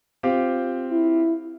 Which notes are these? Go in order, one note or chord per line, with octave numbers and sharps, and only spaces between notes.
C4 F4 G4
E4